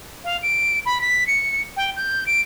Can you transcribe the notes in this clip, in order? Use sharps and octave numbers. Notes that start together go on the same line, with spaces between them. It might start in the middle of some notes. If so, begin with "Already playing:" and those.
F5
D7
B5
B6
C#7
G5
G6
D7